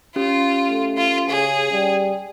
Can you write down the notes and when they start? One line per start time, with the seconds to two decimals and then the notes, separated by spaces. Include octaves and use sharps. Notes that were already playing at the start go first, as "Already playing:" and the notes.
0.16 C#4 F4 G4
0.68 A3
0.97 F4
1.29 C#3 G#4
1.72 G3